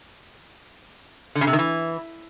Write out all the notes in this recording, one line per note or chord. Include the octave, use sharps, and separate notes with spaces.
D3
C#3
C3
D#3
E3